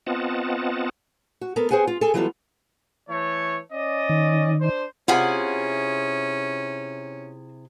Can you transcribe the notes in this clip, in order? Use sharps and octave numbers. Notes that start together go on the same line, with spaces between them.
B3 C4 F4 D#5 F#5 A5
F#4
B3 A4 A#4
C4 G#4 C5 F#5 G#5
F4
G#4 A4 G#5
E3 F#3 G3 B3 F4 A4
E3 A3 C#5
C#4 D5 D#5
D#3
D4 C5
C3 C#4 E4 F4 G#4 F#5